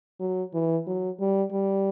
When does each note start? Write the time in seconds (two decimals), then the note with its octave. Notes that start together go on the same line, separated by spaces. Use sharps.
0.20 F#3
0.53 E3
0.87 F#3
1.20 G3
1.52 G3